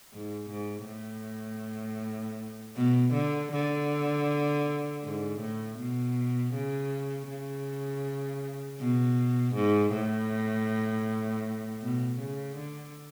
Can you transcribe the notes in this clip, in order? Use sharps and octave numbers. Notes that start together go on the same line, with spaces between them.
G#2
G#2
A2
B2
D3
D3
G#2
A2
B2
C#3
C#3
B2
G#2
A2
B2
C#3
D3